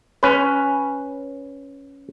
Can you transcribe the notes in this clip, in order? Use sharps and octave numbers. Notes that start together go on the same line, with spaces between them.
C#4 B4